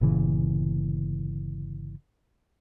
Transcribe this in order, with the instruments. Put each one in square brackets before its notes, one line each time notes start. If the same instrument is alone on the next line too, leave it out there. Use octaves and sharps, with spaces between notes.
[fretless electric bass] G1 A#2 C#3 E3